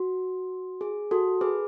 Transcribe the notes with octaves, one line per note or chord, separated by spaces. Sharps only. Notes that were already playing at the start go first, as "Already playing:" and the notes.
Already playing: F#4
G#4
F#4 A4
G#4 B4